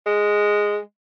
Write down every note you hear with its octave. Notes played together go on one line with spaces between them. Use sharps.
G#3